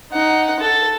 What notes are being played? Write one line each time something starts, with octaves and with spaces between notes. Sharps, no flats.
D#4 F#5
A4